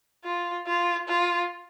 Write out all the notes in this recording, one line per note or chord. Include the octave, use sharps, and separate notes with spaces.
F4
F4
F4